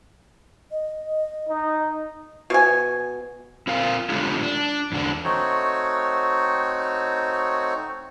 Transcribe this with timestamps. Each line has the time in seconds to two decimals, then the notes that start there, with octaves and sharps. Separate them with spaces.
0.71 D#5
1.49 D#4
2.50 B2 G#5
3.67 C4 F4 A#4 F5
4.10 D3 G#3 A3 D4 F4 G4
4.43 D4
4.92 E2 D3 D4
5.24 A3 C4 D#4 F#4 C#5